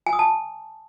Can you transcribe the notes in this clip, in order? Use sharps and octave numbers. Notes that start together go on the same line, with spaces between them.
G#5
D#6
A5